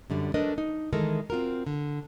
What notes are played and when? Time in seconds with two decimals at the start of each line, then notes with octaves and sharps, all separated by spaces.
0.10 F#2 D3 G3
0.34 F#3 A3 D4 A#4 B4 D#5
0.58 D#4
0.93 D#3 E3 G#3 A3 A4 A#4
1.30 C4 F4 F#4 A#4
1.67 D3